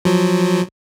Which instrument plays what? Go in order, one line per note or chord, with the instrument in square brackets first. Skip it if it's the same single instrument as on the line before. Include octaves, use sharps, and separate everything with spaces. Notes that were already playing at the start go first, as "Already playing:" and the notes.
[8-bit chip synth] F3 F#3